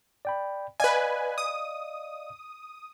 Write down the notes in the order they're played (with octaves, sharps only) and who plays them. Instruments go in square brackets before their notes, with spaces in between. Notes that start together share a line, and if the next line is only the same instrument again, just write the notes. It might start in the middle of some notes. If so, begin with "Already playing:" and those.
[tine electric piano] D5 G5 B5
[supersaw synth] B4 G#5 [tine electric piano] D5 D#5 F5
[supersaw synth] D#6